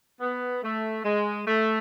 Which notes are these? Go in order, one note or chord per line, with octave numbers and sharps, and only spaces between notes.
B3
A3
G#3
A3